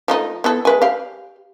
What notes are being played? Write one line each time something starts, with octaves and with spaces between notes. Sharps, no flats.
F3 A3 D#4
B3 E4 A4
G#3 B4 G#5
G4 F5